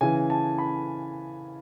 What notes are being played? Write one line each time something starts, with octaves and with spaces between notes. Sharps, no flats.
C#3 E3 G#5
A5
B5